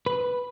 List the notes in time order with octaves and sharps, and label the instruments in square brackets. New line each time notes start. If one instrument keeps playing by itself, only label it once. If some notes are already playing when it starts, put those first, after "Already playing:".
[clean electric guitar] B4